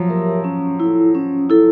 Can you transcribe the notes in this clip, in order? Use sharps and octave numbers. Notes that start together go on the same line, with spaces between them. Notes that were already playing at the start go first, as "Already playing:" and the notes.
Already playing: F3 F#3
G4 A#4 C#5 E5
C#4
E4 A4
C#4
E4 A4